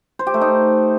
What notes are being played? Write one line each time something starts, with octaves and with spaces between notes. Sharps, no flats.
C5
G4
A3
D#4